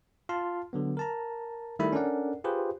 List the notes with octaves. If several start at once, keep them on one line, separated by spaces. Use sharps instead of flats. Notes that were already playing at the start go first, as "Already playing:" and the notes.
F4 A5 C6 F6
D3 F#3 B3
A#4 A5 A#5
D#3 G3 A3 E4 E5 B5
C#4 D4 A4 A#4 D5 F#5
F4 G4 G#4 B4 C5